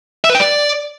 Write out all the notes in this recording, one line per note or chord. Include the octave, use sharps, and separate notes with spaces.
E5
B4
G5
D5